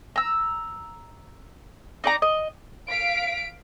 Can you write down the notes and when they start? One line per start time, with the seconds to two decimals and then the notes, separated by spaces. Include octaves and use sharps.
0.16 A#5 E6
2.04 D#4 D5 A#5
2.22 D#5
2.89 F5 B6 D7